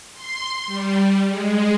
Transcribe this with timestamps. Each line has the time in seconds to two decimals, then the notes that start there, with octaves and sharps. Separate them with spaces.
0.15 C6
0.67 G3
1.29 G#3